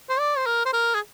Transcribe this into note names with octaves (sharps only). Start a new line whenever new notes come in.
C5
D5
C5
A#4
C5
A#4
G#4